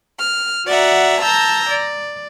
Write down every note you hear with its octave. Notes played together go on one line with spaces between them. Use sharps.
F6
F#4 D5 E5 F#5 A#5
A5 A#5 E6 G6 A#6
D5